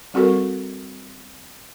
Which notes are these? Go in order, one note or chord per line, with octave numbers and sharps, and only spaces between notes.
G3 C4 F#4 A4 A#4